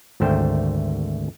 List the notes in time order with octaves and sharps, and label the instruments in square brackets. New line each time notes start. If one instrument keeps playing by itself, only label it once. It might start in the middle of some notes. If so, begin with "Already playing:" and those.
[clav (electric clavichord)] G#1 D2 A3 C5 G5